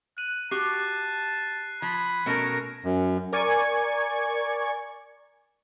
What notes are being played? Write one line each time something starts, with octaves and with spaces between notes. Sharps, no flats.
F#6 D#7
F#4 G4 A5 F#6 C7
F3 B5 G#6
B2 A3 C#4 A#4 C#7
F#2
A#4 D5 G#5 C#6 G#6